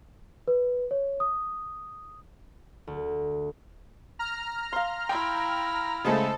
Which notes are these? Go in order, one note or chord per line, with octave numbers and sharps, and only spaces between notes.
B4
C#5
D#6
D2
A#5 F6
F5 C6
E4 G5
C#3 G#3 A3 A4 C5 D#5 A5